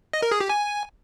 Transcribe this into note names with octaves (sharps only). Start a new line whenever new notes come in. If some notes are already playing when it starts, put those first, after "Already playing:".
D#5
A#4
G#4
G4
G#5